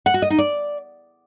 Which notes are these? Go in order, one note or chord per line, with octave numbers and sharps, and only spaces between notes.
F#5
F#4
D#5
D#4
D5